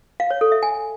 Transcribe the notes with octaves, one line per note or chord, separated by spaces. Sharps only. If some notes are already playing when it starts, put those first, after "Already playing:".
F5
C#5
A4
E5
G#5